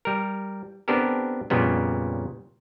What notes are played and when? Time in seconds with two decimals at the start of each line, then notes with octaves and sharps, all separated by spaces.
0.05 G3 A#4
0.88 B3 C4 D4 G4 A4 A#4
1.50 F2 A#2 C#3 G3 B3